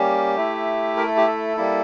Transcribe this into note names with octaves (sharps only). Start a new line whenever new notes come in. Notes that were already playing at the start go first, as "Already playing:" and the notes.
Already playing: G3 A#3 C#4 G4
A3 E4
A#4
A4
G4
A4
G3 A#3 E4